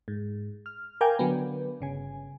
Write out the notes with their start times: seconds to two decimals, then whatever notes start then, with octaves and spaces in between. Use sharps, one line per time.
0.08 G#2
0.66 F6
1.01 A#4 F5 G5 G#5 D6
1.19 D3 F#3 B3
1.81 G1 C#3 G#5